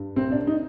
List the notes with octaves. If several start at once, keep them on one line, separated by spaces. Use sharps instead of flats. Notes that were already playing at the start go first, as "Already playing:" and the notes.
Already playing: G2
C2 C4
D4
D#4